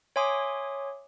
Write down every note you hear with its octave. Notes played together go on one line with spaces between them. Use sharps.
C#5 E5 G#5 C6 D6 D#6